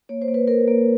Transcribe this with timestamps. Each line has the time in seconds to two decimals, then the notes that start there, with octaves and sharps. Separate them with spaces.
0.09 A#3 C#5
0.22 C5
0.28 A#3
0.34 B4
0.47 A#3 A#4
0.68 A#3